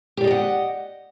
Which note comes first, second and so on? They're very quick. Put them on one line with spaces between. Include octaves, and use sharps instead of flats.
G4 D5 D#5 G5 F#5